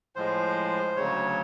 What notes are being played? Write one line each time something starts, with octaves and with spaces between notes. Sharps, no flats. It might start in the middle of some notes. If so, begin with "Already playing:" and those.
A2 F3 G#3 C5
D2 C#3 F#3 C#5